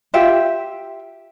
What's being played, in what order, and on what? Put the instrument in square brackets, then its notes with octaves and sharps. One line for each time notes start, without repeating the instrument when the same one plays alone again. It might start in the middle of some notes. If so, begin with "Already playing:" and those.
[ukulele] F4 G4 E5 G5